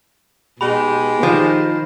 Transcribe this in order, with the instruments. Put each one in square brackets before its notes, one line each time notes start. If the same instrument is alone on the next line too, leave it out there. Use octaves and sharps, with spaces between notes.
[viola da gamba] B2 B3 [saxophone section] G#3 D#4 G4 [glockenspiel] B5
[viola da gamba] D#3 C5 [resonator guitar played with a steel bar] F3